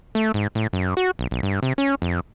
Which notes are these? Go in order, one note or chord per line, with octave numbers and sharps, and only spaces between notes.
A3
G#2
A2
F#2
F#4
B1
B1
G2
C3
C#4
F2